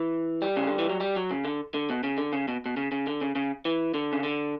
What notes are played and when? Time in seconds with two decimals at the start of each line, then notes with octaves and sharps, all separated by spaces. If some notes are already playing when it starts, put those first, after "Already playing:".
Already playing: E3
0.42 G3
0.57 C#3
0.67 D3
0.79 E3
0.89 F#3
1.00 G3
1.16 F#3
1.31 C#3
1.45 D3
1.74 D3
1.90 B2
2.03 C#3
2.18 D3
2.33 C#3
2.48 B2
2.66 B2
2.77 C#3
2.92 C#3
3.07 D3
3.21 C#3
3.35 C#3
3.65 E3
3.94 D3
4.13 C#3
4.23 D3